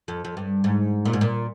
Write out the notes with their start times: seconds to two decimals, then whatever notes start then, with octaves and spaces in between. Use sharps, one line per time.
0.08 F2
0.25 F2
0.37 G2
0.64 G#2
1.05 A#2
1.13 G#2
1.21 A#2